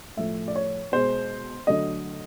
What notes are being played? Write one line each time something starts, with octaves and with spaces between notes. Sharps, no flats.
A2 F3 A3 E5
D5
C#5
B2 G#3 C5
D3 F#3 A3 D#5